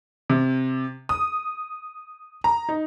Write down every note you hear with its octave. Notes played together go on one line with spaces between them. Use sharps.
C3
D#6
A#5
D#4